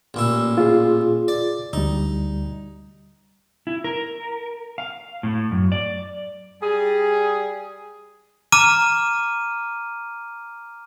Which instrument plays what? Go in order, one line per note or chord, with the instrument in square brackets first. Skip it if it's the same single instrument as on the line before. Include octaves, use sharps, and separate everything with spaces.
[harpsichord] A1 A#2 E4
[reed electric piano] F4 G#4
[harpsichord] D5
[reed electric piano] D2 G3 [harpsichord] D#4
[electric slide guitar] E4
A#4
F5
A2
F#2
D5
[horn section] G3 G#4
[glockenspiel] A#5 D6 F6 D#7